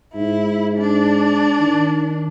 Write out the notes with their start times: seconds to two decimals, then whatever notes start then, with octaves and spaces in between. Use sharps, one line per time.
0.15 G#2 E4
0.79 D4
1.59 D#3